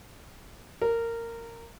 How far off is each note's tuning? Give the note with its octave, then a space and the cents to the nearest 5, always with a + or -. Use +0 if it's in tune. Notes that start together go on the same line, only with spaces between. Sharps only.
A#4 -15